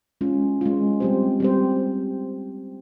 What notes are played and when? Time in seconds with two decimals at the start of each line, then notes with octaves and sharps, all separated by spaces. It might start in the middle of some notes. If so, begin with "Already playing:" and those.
0.21 G#3 C#4 F4
0.61 G#3 C#4 F4
1.00 G3 C4 G4 C5
1.40 G3 C4 G4 C5